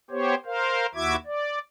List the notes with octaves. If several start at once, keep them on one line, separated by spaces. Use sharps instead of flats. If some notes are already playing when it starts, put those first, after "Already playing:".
B3 G4 C5 C#5
A#4 C5 F5
D#2 E4 F#4 E5 D6 G#6
D5